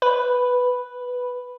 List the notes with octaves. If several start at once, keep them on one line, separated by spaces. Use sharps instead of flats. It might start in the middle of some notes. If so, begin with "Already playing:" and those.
B4